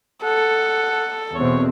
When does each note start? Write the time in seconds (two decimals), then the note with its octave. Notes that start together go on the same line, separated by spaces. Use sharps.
0.24 A4 F#5
1.35 E2 B2 C4 C#5